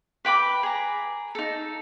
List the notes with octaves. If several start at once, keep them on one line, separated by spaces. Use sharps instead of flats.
B4 G5 B5 D6
G#4 A#5
D#4 A4